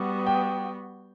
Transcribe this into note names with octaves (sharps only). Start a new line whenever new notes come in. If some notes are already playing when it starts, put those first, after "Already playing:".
Already playing: G3 B3 F#4
G5